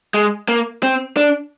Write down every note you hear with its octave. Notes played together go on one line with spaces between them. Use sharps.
G#3
A#3
C4
D4